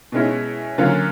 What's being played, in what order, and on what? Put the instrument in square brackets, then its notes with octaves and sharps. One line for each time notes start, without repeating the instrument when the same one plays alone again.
[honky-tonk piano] B2 G#3 C#4 E4
D3 F#3 A#3 C#4 F4